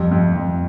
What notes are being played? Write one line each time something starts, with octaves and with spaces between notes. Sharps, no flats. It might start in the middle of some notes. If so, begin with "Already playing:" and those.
Already playing: F2 G3
F2
F2